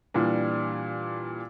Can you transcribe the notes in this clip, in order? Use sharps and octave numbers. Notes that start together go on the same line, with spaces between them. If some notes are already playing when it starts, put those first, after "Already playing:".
A#2 E3 G3 D4